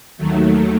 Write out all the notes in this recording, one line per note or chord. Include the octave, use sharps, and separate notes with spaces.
D#2 D#3 F#3 A3